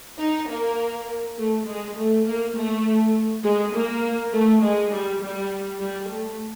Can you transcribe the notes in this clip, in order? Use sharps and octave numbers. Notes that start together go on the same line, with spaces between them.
D#4
A#3
A3
G#3
A3
A#3
A3
G#3
A#3
A3
G#3
G3
G3
G3
A3